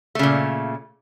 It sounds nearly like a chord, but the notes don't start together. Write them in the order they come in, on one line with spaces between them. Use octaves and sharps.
A3 C#3 A#2